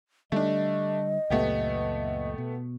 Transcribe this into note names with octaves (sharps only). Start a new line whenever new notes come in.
D3 G3 A3 D4 D#5
C#2 F#2 A#2 A3 B3 G4
B2